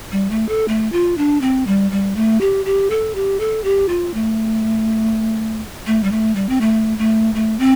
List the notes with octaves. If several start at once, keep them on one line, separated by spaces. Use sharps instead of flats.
G3
A3
A4
A3
F4
D4
C4
G3
G3
A3
G4
G4
A4
G4
A4
G4
F4
A3
A3
G3
A3
G3
C4
A3
A3
A3
C4